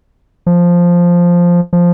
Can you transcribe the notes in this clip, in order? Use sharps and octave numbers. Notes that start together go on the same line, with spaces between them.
F3
F3